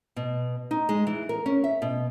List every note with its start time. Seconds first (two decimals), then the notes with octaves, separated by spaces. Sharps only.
0.16 B2
0.71 D#4
0.89 G#3
1.07 E3
1.29 A#4
1.46 C#4
1.64 E5
1.82 B2